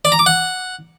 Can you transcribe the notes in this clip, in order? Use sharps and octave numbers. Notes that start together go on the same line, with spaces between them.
D5
A#5
D6
F#5